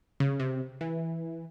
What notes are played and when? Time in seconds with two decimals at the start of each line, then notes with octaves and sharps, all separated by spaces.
0.20 C#3
0.40 C3
0.81 E3